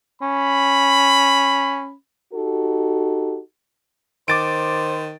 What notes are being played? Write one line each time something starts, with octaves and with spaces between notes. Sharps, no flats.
C#4 B5
D#4 F#4 G4 A4
D#3 C5 D6 A6 D7